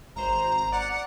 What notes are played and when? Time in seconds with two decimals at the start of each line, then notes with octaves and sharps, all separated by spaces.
0.16 G#1 C5 A#5
0.72 D5 F#5